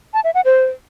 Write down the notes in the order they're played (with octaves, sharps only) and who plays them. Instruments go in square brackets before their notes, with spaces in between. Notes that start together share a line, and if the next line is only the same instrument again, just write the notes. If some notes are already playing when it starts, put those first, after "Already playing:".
[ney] A5
E5
F#5
C5